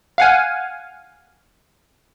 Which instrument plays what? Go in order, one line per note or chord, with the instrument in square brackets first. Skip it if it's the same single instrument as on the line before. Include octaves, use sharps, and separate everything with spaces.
[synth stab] F5 F#5 G#5